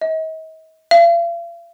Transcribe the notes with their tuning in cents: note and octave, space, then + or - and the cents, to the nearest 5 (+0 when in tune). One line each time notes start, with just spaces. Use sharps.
D#5 +40
F5 -45